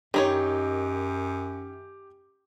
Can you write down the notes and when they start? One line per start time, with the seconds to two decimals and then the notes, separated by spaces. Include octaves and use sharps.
0.14 F#2 D#3 D#4 G4 C#5 G5